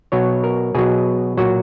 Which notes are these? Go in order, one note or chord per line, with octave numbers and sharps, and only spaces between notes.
B2 F#3 C#5
A#4
B2 F#3 G#4
A#2 F#3 F#4